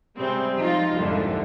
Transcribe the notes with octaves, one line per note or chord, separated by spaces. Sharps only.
C3 G3 G#3 C4
F3 D#4 F4
C2 F2 G#2 D3